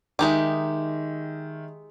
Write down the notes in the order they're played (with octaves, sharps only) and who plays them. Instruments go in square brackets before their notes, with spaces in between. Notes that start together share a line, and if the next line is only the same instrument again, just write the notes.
[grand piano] D#3 E5 [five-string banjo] G#3 D#4 G4